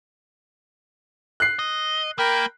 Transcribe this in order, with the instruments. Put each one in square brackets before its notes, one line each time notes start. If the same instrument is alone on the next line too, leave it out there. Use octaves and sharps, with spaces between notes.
[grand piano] F#6 C7
[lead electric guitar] D#5
[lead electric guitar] A#3 [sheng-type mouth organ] A#4 G5 B5